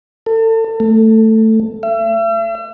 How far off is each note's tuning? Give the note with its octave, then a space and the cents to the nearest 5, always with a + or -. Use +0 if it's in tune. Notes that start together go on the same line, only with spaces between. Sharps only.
A4 +35
A3 +10
E5 +40